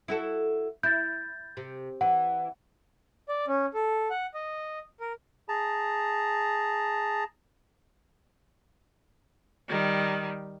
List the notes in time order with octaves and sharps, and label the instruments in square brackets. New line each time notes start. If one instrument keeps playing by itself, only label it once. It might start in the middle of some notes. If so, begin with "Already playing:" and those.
[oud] E4 F#4 A4
[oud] E4 [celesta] G6 A6
[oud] C3
[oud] E3 [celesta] F#5
[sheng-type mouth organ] D5
C#4
A4
F#5
D#5
A#4
[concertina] G#4 A5 A#5
[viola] D#3 G3